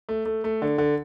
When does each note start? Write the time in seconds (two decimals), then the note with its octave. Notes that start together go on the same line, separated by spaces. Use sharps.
0.09 A3
0.26 A3
0.44 A3
0.62 D3
0.78 D3